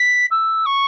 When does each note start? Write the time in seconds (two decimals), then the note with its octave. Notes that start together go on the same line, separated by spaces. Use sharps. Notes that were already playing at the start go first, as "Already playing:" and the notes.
Already playing: B6
0.31 E6
0.66 C#6